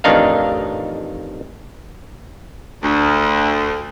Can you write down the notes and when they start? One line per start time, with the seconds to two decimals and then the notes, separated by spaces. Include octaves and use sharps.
0.04 A1 F2 D#3 D4 D#4 F5
2.83 D2